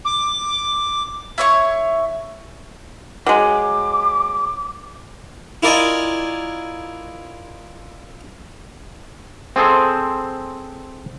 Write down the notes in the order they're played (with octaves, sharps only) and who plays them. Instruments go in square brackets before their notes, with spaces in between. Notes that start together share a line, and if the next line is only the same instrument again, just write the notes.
[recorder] D6
[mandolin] E4 C#5 C#6
[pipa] F#3 G#3 [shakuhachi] D6
[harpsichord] E4 F4 A#4 D5 D#5 G#5
[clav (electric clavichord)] C4 G#4 A4 C5